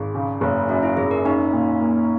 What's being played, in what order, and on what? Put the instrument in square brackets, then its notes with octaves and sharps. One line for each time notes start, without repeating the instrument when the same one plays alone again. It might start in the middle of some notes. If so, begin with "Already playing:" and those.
Already playing: [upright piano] G#1 [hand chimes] G#4
[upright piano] C#3
F#1
[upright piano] F#2 [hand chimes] F#4
[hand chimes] E4
[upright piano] F#1 [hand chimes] G#4
[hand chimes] A#4
[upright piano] C#4 [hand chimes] D#4
[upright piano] A#2
A#3